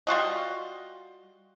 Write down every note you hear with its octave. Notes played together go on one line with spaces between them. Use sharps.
G3 F4 F#4 D#5